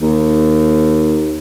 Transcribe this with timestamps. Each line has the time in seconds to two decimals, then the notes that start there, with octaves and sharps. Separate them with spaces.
0.02 D#2